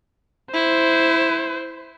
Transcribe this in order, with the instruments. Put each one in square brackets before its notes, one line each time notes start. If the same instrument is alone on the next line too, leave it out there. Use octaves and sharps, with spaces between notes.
[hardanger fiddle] E4 [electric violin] C5